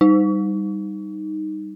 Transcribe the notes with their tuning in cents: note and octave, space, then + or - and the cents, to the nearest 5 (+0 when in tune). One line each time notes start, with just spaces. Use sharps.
G3 +0 D#4 +0